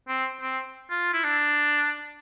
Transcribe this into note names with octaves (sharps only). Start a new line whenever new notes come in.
C4
C4
F4
E4
D4